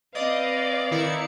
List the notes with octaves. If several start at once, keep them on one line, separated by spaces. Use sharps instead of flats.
C4 B4 D5 D#5 F5
D#3 E4 C#7